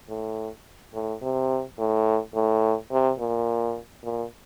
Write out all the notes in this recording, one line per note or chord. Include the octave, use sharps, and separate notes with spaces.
A2
A2
C3
A2
A2
C3
A#2
A#2